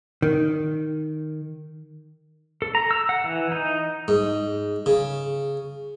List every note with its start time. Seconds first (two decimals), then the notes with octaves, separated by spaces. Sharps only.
0.22 D#3
2.62 A4
2.75 A#5
2.91 E6
3.09 F#5
3.24 E3
3.52 D#4
4.08 G#2
4.86 C#3